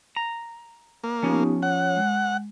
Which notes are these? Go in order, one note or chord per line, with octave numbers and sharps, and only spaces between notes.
A#5
A#3
F3 B3 C#4 D#4 G4
C#5 F#5
G#3